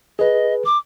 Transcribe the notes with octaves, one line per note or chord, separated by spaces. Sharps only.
G#4 B4 D#5
D6